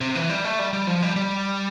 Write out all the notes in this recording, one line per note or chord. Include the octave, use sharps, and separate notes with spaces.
C3
E3
G3
A3
G3
G3
F3
G3
G3